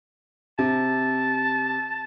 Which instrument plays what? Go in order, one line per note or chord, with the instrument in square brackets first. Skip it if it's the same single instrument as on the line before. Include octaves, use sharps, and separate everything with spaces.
[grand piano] C3 [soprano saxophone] A5